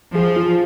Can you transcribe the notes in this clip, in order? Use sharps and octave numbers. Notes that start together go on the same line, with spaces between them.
F3 G#4
F4